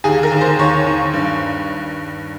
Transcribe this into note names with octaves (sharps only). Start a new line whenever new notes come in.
D#2 G#4
A#4
D#2
C5
D#2 C#5
D#2
G2